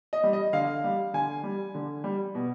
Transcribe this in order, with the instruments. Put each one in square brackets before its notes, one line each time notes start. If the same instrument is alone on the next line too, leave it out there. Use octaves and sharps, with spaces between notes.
[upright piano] D#5
G3
D#5
D3 F5
G3
D3 G#5
G3
D3
G3
B2